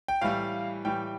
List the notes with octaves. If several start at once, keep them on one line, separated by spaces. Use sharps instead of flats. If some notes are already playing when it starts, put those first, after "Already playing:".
G5
A2 E3 G3 F5
A2 E3 G3 G5